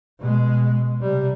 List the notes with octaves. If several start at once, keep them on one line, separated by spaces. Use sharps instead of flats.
B2 G#3
C3 G3